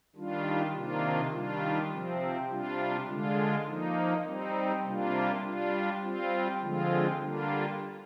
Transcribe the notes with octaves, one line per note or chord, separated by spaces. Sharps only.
D#3 G3 D4 F4
C3 D#3 A#3 D4 F4
D#3 G3 D4 F4
C3 F3 C4
C3 G3 D4 F4
D3 G#3 D4 F4
F3 A#3 D#4
G3 C4 D#4
C3 G3 A#3 D4 F4
G3 D4 F4
G3 C4 F4
D3 F3 G#3 C4 F4
D3 G3 A#3 D4 F4